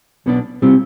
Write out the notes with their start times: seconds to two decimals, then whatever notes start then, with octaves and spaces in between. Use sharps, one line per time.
0.26 B1 B2 B3 D4
0.62 C3 G3 C4 F4